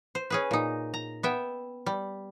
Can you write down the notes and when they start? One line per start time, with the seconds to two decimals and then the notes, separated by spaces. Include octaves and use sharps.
0.15 C5
0.30 C#4 G#4 B4
0.51 A#2 D#4
0.94 A#5
1.23 B3 E5 G5
1.86 G3